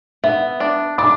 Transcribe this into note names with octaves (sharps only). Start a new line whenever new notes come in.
B3 E5
D4
D4 D6